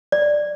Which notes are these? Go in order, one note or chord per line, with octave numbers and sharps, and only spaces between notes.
D5